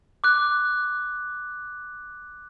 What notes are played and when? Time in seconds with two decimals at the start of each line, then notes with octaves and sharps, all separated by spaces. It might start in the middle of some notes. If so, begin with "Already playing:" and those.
0.24 D6 F#6